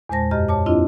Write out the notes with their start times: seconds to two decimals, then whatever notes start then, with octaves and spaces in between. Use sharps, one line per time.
0.09 E2 A#2 G#3 C5 A5 A#6
0.31 F#2 G4 D#5 F6
0.49 C#5 A5 D6
0.66 C4 D4 E4 F4 D#5